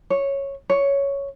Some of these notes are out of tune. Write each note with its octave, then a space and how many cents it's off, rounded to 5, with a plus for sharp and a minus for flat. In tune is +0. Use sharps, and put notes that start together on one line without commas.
C#5 -5
C#5 +5